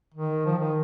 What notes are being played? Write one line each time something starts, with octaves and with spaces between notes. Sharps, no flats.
D#3
F3
D#3